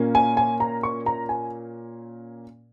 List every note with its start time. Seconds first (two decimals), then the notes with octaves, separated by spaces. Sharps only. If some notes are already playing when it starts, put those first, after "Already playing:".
Already playing: A#2 A#3 C#4
0.15 G#5
0.37 G#5
0.60 A#5
0.83 C#6
1.06 A#5
1.29 G#5